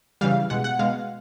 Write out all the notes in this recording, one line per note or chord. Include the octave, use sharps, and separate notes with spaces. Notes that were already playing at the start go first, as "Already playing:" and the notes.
C#3 E3 G3 F5
B2 G#3 F#5
F#5
B2 G#3 F5